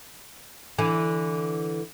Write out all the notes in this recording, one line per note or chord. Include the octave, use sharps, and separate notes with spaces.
D3 E3